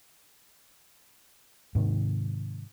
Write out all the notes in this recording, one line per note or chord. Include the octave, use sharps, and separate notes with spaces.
G#2 C3 D#3